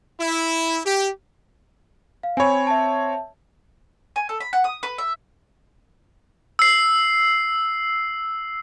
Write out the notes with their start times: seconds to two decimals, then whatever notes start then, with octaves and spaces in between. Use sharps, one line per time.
0.20 E4
0.85 G4
2.23 F5
2.37 C4 C#5 G#5 B5
2.67 E5 A5
4.16 G#5
4.29 A4
4.40 B5
4.53 F#5
4.64 D#6
4.83 B4
4.98 E5
6.59 E6 C7